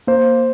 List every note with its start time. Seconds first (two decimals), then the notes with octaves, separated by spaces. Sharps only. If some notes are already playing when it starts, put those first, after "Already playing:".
0.07 A#3 C5